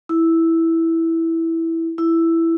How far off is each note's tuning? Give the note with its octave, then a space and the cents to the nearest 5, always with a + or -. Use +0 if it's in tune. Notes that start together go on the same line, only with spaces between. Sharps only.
E4 -5
E4 +5